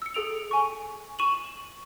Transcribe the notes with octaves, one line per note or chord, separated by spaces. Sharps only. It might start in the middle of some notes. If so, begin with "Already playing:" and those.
E6 C#7
G#4 A4 D7 F7
G#5 C#6
C#6 D#7 E7 F#7